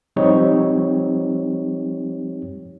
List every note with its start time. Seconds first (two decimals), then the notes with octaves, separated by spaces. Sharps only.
0.16 F3 G3 C4 D#4 G4 C#5